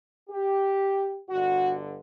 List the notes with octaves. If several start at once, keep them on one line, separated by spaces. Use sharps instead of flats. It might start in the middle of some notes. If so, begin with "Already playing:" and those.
G4
G1 G2 D3 F#4